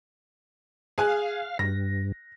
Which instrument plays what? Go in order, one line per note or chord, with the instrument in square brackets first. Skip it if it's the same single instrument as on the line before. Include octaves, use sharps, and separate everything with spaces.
[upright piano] G#4 G#5 F#6 [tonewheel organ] F5
[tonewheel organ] G2 [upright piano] A#6